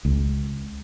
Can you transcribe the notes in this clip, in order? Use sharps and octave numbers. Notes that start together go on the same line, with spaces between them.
C#2